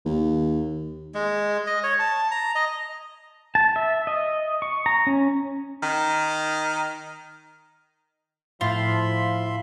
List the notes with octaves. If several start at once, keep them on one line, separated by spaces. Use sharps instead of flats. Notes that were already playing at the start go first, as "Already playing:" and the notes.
D#2
G#3
D#5
C#5
A5
A#5
D#5
A5
E5
D#5
C#6
A#5
C#4
D#3
A2 F3 F4 E5 B5 C6